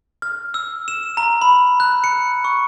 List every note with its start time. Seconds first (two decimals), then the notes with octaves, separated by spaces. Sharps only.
0.22 F6
0.54 E6
0.88 E7
1.17 A#5
1.42 B5
1.80 F#6
2.04 C#7
2.44 C#6